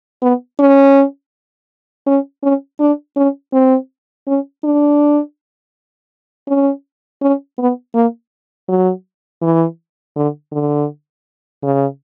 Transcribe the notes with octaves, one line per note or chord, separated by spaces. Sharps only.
B3
C#4
C#4
C#4
D4
C#4
C4
C#4
D4
C#4
C#4
B3
A#3
F#3
E3
D3
D3
C#3